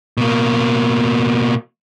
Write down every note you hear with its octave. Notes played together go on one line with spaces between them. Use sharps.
B2 A#3